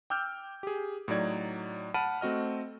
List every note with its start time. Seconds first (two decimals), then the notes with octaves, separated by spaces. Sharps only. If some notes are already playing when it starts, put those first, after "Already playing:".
0.10 G5 D6 E6 F6 G6
0.63 G4 G#4
1.08 A2 F#3 D#4 D5 G#6
1.94 F#5 A5 B5 F6 D7 D#7
2.21 A3 C4 F#4 D#5 F6